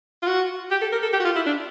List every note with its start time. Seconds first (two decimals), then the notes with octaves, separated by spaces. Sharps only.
0.23 F4
0.27 F#4
0.71 G4
0.82 A4
0.92 A#4
1.03 A4
1.13 G4
1.20 F#4
1.25 F4
1.36 E4
1.46 D4